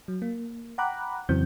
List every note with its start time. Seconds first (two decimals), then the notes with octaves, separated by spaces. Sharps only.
0.08 F#3
0.22 A#3
0.78 F#5 G5 A#5 B5 D6 F#6
1.29 F2 C#3 E3 F#3 C4 G6